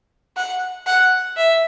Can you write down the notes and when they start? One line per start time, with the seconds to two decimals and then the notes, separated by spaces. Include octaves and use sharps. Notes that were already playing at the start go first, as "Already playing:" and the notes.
0.37 F#5
0.87 F#5
1.37 E5